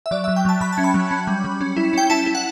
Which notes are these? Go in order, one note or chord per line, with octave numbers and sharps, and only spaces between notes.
E5
F#3 D5
E5
F#3
G5
F#3 A5
F#3 B5
A5
C#4
B5
F#3
C#4
G3
G3
C#4
E4
C#4 G5
E4 A5
E4
F#5